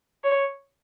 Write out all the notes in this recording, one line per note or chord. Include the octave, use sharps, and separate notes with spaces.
C#5